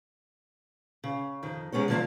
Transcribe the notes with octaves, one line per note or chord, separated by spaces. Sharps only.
C#3
F2 D#3
C3 G#3 B3 C#4 C#5
D3 E3 F3 A#3 C4 D4